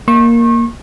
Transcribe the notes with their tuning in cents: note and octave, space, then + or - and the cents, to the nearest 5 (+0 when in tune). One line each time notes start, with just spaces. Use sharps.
A#3 +0 C#6 -35